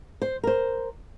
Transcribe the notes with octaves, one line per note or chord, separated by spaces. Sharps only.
C5
A#4 C5